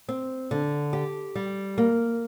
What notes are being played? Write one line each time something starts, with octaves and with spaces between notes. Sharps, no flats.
C4
D3
G4
G3
A#3